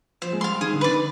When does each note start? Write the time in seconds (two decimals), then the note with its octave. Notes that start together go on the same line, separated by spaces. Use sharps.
0.22 F3 C5
0.33 G#3
0.41 G3 F5 C6
0.61 D#3 G#4
0.73 D3
0.81 D#3 B4 D5